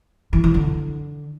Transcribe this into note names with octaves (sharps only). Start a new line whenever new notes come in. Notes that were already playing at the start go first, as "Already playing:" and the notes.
E3
E3
D3